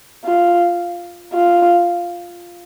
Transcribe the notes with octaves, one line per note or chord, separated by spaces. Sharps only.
F4
F4